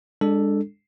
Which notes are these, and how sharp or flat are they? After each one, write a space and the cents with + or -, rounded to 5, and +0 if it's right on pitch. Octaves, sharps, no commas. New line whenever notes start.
G#3 -30 D4 +0 A4 +0